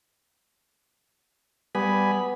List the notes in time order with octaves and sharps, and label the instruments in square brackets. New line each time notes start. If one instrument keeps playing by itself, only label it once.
[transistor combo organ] G3 G#5 B5 [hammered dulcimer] B3